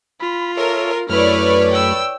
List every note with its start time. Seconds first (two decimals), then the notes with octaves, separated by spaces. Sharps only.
0.20 F4 B5
0.57 A4 A#4 C#5 E5
1.09 F#2 A3 E4 B4 C#5 D5 F6
1.71 G5 E6